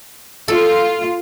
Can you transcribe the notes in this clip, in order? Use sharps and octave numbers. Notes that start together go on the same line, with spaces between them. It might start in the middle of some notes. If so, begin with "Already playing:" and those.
F4 A4